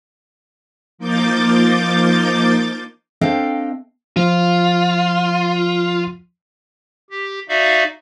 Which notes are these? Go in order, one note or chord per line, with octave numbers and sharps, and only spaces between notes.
F3 A#3 D#4 D6 G6 A6
C4 D4 A4 D#5 F5 G5
F3 F4
G4
D#4 F#4 D5 E5 F5